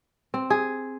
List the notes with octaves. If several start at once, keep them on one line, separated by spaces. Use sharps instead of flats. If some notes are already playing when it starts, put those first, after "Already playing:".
C4
G#4